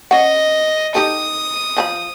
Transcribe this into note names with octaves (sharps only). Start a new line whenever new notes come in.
C#4 D#5 F#5
D#4 G4 A4 D#6
F3 A5 B5